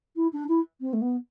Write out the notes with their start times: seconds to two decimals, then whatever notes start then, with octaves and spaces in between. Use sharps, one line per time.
0.16 E4
0.33 D4
0.48 E4
0.80 C4
0.93 A3
1.01 B3